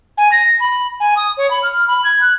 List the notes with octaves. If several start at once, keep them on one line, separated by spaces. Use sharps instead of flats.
G#5
A#6
B5
G#5
D#6
C#5
B5
F6
B5
G#6
F#6